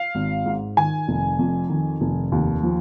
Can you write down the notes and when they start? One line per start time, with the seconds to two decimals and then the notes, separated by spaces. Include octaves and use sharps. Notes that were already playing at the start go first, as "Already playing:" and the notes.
Already playing: F5
0.15 G#1
0.46 G#2
0.77 D#3 G#5
1.08 F1
1.39 F2
1.70 D#3
2.01 F1
2.32 D#2
2.63 F3